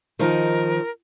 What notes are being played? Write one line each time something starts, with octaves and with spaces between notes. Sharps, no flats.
D#3 F3 D#4 A#4